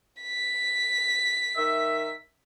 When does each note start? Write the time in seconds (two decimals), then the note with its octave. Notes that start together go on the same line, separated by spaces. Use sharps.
0.23 B6
1.57 D#3 E5